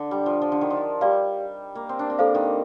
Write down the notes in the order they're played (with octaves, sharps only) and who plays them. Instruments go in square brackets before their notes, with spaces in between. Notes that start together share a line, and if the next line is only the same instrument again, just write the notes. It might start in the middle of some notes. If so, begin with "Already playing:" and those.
Already playing: [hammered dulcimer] D3
G3
F3
F3
D3
D#3
F3
[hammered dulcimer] G3 [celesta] G4 D5 F5
[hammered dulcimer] A#3
C4
D4
C4
[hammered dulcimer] A#3 [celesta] A4 C5 F5
[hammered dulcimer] D#3